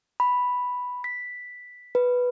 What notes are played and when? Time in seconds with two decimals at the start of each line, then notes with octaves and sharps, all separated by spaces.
0.20 B5
1.04 B6
1.95 B4